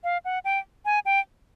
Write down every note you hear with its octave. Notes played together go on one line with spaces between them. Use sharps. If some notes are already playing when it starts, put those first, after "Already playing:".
F5
F#5
G5
G#5
G5